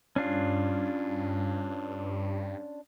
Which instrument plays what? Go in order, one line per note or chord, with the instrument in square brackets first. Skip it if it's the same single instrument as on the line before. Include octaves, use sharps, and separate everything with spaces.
[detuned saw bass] G2 [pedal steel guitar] C#4 D4 F4